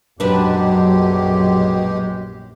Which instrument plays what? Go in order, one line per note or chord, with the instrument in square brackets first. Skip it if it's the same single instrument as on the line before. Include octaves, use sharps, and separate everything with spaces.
[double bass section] A#1 F#2 [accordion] B2 G#3 G4 [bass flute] F#3 [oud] D4 B4